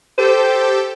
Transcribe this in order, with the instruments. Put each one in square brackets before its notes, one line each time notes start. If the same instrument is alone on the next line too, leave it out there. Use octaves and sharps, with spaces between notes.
[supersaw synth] G4 A4 G5 [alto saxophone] C5